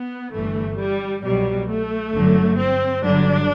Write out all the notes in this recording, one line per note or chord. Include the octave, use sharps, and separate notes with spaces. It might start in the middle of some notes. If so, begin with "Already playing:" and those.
Already playing: B3
G1 G2 E3 A3
G3
C2 B2 F#3 G3
A3
G1 F#2 D3 F#3
C4
G1 G2 D3 F#3 D4